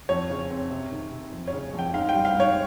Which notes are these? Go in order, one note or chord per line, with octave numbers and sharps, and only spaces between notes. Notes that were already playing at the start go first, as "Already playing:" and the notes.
F2 C#5
C#3
C4
C3
D#3
C3
F2
C#5
C#3
F2
G5
G#2 F5
G5
G3
F5
G#2
C#5